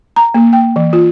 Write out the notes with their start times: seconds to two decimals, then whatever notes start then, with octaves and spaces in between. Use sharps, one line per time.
0.16 A#5
0.34 A#3
0.53 G5
0.76 E3
0.93 F4